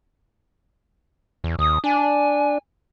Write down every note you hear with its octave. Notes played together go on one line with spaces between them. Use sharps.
E2
D#2 D#6
D4 G#5